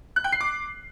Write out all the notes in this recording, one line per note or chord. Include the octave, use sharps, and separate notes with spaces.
F#6
G5
C7
D6